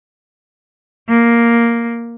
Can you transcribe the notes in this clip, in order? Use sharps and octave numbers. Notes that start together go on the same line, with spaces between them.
A#3